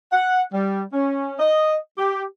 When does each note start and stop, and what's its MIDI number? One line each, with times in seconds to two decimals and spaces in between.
0.13 0.44 78
0.53 0.84 55
0.93 1.34 61
1.40 1.76 75
1.98 2.24 67